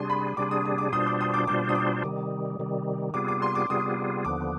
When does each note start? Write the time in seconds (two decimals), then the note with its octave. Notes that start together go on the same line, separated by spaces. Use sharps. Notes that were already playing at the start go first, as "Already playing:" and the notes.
Already playing: C3 G3 D4 G#4 C6
0.10 B5
0.37 C3 G3 D4 G#4 D6
0.51 D#6
0.65 D#6
0.78 D6
0.92 B2 G3 D4 F4 C5 D#6
1.07 D6
1.21 D#6
1.34 D6
1.47 B2 G3 D4 F4 C5 D6
1.69 D#6
1.75 D6
2.04 C3 D#3 G3
2.59 C3 D#3 G3
3.14 C3 G3 B3 F4 G#4 D6
3.28 D6
3.42 C6
3.55 D6
3.70 C3 G3 B3 F4 G#4 D#6
4.25 D#2 D3 F3 B3 D6